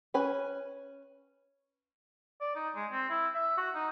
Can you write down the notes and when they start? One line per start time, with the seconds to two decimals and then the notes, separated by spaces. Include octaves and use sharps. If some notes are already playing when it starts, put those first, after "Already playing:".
0.14 C#4 B4 G#5
2.41 D5
2.55 D#4
2.75 G#3
2.91 C4
3.10 E4
3.34 E5
3.57 F#4
3.75 D#4